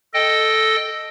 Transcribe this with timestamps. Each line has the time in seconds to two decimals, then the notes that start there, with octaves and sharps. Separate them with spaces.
0.14 A4 D#5 G5